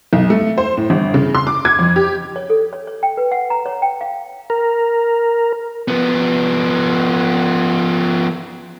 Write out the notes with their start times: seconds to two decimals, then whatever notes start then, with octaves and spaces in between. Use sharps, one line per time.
0.13 B1
0.30 A3
0.58 C5
0.77 A2
0.90 G1
1.14 C#3
1.35 C6
1.47 D6
1.65 G#6
1.79 F2
1.96 G4
2.36 C#5
2.50 A4
2.73 C#5
2.87 C#5
3.03 G5
3.17 B4
3.32 F#5
3.50 A#5
3.66 C#5
3.82 G5
4.01 F5
4.50 A#4
5.88 F3 B3